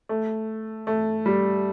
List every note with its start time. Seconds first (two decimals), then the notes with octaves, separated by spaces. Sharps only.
0.09 A3
0.87 A3
1.26 G3